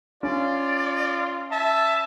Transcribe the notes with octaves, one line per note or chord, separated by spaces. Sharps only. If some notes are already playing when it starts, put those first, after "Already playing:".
C#4 F4 D5
E5 A5